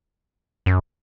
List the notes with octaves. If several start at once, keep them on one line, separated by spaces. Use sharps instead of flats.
F#2